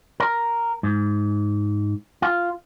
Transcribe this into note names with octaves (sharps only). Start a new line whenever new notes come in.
A#4
G#2
F4